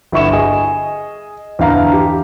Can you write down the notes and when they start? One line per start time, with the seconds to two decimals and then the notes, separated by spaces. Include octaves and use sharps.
0.12 G1 E4 C#6 E7
0.32 G#4 D#5
1.59 E2 D3 F5 A#5
1.93 G4